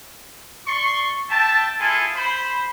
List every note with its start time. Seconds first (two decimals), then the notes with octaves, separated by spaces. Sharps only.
0.67 D5 C6 C#6
1.30 E5 G5 A5
1.79 E4 F4 G#4 A4 G#5
2.15 C5 B5